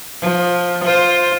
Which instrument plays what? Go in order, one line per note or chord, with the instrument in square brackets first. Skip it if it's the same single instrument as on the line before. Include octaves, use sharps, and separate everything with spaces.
[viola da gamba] F3
F4 C5